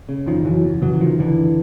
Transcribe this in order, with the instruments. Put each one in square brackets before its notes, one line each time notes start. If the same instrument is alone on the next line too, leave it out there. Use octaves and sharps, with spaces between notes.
[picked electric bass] C#3
F#1 D#3 F3
F#1 E3 F#3
E2
C#3 E3 F#3
F#3
F#1 D#3 F3
F#1 D3 E3